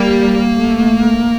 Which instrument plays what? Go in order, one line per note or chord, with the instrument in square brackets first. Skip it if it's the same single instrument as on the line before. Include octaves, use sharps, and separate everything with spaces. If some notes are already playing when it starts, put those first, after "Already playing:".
Already playing: [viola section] G3 [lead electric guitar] A#3
[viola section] A3